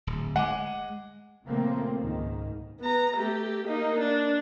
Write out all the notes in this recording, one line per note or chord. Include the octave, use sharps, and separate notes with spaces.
D1
G#3 F#5 G#5 D6
A#2 C#3 F3 A3 A#3 C4
C#2 G#2 D#3
B3 A#5
A3 G4
A#3 D#4
D4